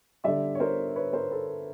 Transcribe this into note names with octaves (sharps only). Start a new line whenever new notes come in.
D3 G3 D5 E5
C#5
A#4 C5
B4 C#5
A#4 C5
A4 B4